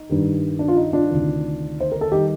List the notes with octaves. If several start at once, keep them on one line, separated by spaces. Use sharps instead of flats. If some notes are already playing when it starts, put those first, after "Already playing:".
Already playing: D#4
G2 D#3 G3
D4
F4
D#4
D4 F4
D2 C3 D#3
C5
A#4
A4
D#3 G3 D#4 G4